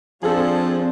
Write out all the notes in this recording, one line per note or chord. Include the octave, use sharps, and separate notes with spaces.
F3 C4 D4 G#4 A4 C5